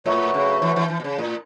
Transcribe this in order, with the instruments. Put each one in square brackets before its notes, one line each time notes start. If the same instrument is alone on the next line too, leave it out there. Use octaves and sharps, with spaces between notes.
[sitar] A2 [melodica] F#3 A3 F#4 B4
[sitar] C#3
E3
E3
E3
B2
C#3
A2